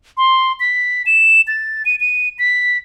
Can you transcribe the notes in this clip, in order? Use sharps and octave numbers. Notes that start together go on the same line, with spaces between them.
C6
B6
E7
A6
D#7
D#7
B6